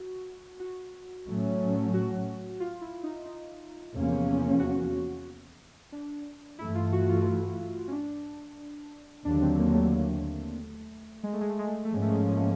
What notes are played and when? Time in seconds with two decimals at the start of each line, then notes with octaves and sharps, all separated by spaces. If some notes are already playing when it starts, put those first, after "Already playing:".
Already playing: F#4
0.60 F#4
1.27 A2 F#3 A3 C#4
1.94 F#4
2.60 F4
2.81 E4
3.03 D#4
3.26 D#4
3.93 E2 C3 F3 A#3 C#4
4.59 F#4
5.92 D4
6.59 G2 E3 A3 E4
6.75 F4
6.92 F#4
7.09 F4
7.25 E4
7.88 C#4
7.92 D4
9.24 D#2 D3 F#3 D4
9.42 C4
9.58 A#3
9.74 A3
11.23 G#3
11.33 A3
11.41 G#3
11.50 A3
11.59 G#3
11.67 A3
11.75 G#3
11.85 A3
11.90 G#2 F3 G#3 A#3 C#4
12.02 A3
12.11 G#3
12.19 A3
12.27 G#3
12.36 A3